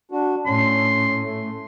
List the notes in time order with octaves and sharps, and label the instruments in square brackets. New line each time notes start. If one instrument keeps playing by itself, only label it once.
[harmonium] D4 F#4
[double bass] A2 [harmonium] C#4 [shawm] C6
[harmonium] A3